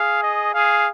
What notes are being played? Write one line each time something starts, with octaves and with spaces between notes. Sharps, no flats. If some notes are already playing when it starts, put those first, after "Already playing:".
Already playing: G#4 F5
D#5
G#4 F5